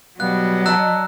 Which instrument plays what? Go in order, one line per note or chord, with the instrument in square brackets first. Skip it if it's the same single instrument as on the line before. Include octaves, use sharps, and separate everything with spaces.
[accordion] B2 G3 B3 [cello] F#3 [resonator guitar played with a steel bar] F5 [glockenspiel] F#6
[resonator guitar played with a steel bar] D5 D#5 A5 [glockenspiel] A#5 E6 F#6